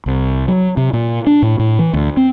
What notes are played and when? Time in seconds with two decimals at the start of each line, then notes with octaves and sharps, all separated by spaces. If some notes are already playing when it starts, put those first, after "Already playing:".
0.06 C2
0.48 F#3
0.77 C3
0.93 A#2
1.27 D4
1.42 A2
1.59 A2
1.79 E3
1.94 D2
2.17 C4